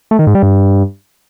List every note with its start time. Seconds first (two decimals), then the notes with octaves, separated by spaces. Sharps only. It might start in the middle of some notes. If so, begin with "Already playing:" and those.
0.11 A3
0.19 D#3
0.27 G#2
0.35 G3
0.43 G2